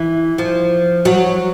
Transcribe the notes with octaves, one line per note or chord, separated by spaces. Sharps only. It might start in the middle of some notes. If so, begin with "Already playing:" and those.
Already playing: E3
F3
F#3